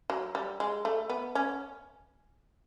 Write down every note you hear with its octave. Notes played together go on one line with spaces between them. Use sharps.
F#3
G3
G#3
A3
B3
C#4